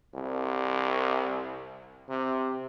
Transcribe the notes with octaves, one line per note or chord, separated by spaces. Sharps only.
C2
C3